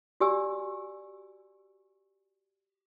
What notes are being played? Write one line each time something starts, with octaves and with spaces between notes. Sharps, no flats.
F#4 G4 D5 G#5 E6